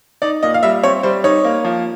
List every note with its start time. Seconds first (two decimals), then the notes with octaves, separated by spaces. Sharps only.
0.22 D#4 D5
0.43 A#2 D#5
0.54 F5
0.63 G3 E5
0.83 C4 C#5
1.03 G3 C5
1.24 D#4 C#5
1.44 A#3
1.64 F3